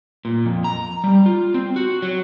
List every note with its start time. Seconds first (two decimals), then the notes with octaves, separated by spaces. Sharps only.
0.25 A#2
0.46 F2
0.64 A#5
1.04 G3
1.26 F4
1.54 C4
1.76 F#4
2.02 F#3